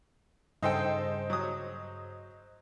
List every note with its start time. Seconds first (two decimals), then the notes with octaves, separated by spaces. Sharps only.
0.63 G2 C#3 D#4 G#4 A4 C5 D#5 G5
1.30 F#3 D#6